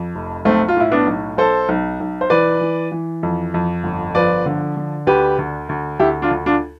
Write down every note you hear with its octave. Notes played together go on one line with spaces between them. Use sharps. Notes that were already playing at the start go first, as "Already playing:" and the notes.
Already playing: F2
F1
B1 A3 C4
F4
A2 E4
B3 D4
B1
B1 A4 C5
B1
B1
C5
E3 B4 D5
E3
E3
F2
F2
G1
F3 B4 D5
D3
D3
D2 G4 B4
D2
D2
D2 E4 G4
D4 F4
D2
D4 F4